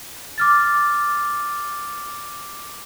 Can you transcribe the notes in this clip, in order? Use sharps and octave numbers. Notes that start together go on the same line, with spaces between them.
D6 F6 A6